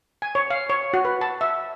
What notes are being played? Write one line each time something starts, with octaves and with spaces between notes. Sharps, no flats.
G#5
C#5
F5
C#5
F#4
B4
A5
E5